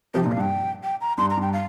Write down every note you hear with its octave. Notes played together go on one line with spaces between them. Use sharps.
C3 F3 G4
A#2 D#4
F5
G2
G5
G5
A#5
G2 C6
A#5
G2 G5
F5